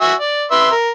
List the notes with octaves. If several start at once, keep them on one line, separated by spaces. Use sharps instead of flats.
F#4 E5 G#5
D5
B4 E5 C6
A#4